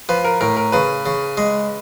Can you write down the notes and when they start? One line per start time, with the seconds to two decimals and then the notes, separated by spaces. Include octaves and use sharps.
0.09 F3 B4
0.24 A#4
0.41 A2 A#4
0.57 A#4
0.72 C#3 B4
1.06 C#3
1.37 G#3